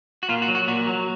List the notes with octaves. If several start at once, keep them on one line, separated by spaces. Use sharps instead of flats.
F#4
A#2 F4
F#4
F#3
F#4
A#2 F#4
F#3